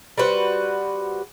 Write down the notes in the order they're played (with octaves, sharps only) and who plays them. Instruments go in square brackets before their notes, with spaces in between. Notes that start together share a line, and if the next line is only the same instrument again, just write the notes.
[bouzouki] G3 F#4 B4 C5